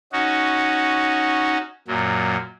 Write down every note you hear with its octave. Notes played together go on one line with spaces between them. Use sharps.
C#4 D#4 F#4
F#2 A#2 F#3